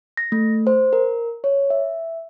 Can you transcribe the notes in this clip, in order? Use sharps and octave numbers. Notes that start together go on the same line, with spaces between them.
A#6
A3
C5
A#4
C#5
E5